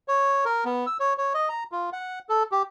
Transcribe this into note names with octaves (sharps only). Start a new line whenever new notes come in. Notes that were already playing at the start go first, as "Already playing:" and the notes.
C#5
A#4
B3
E6
C#5
C#5
D#5
A#5
F4
F#5
A4
G4